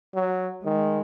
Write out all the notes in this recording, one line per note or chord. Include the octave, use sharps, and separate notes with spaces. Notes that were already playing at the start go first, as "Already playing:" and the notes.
F#3
D#3 G#3